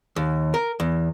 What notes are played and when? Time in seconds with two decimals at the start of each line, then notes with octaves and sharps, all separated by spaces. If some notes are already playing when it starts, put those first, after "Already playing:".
0.16 D#2
0.54 A#4
0.80 E2